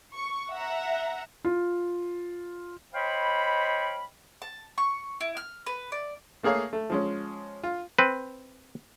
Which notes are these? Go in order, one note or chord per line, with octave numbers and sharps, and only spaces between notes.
C#6
E5 F#5 A#5
F4
C5 C#5 D#5 F5 G5 B5
A5
C#6
E4
F6
B4
D5
A3 A#3 G#4 C#5 F5
A3
F3 G#3 C#4
F4
C4 B4